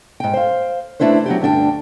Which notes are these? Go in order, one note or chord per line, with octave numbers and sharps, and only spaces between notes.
G#2 G5
C5 F5
A3 D4 E4 B4 C5
F#3 B3 G4
D2 G2 D4 G5